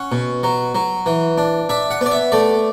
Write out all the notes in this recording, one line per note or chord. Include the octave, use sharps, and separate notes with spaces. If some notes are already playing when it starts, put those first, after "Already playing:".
Already playing: C#4 F#5
B2
F#3
F#3
E3
D4
D4 E5
F#5
B3 D5
E5
A3 D5